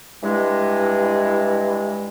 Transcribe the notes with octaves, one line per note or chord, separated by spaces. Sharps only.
G2 E3 G#3